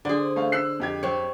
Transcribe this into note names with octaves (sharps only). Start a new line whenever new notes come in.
D3 G#4 C5 D5
A3 F5
E6 F#6 C7
F2 G4 G#6
C4 C#5